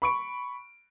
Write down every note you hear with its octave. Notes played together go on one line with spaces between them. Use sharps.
B5 C#6 D7